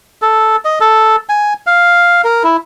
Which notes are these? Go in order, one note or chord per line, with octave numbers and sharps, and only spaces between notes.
A4
D#5
A4
G#5
F5
A#4
E4